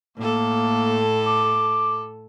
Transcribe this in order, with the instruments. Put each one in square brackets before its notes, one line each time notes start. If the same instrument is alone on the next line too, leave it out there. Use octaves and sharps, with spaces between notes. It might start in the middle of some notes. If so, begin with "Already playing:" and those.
[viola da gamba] A2 A4 [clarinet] A#3
[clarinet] D6